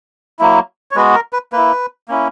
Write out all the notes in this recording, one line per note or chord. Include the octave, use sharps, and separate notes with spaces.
F#3 A#3 E4
C#5
G#3 B3 F#4 B4
A#4
B4
A#3 E4 B4
A#3 C#4 E4